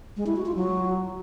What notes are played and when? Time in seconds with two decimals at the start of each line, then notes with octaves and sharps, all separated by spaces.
0.17 G#3
0.26 E4
0.36 F#4
0.46 F4
0.56 F#3